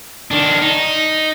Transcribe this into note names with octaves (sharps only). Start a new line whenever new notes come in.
D#3 D4
D#4